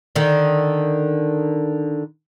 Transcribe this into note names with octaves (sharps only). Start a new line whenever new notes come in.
D3 D#3